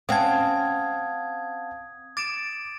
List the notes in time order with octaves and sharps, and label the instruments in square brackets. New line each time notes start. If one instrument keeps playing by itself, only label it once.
[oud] C4 C#4 [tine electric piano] F5 F#5 A5 [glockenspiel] D#6 G#6
[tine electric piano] D6 [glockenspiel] A6 D7 E7